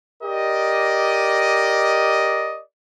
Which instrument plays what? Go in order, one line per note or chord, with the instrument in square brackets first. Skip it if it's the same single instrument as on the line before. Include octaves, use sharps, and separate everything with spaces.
[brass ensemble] G4 A#4 D5 D#5